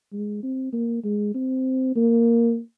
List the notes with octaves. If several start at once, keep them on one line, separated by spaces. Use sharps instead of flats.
G#3
C4
A#3
G#3
C4
A#3